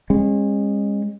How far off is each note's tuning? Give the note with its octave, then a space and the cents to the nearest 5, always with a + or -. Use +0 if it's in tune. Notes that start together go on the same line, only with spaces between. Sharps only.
G#3 -30 C#4 -35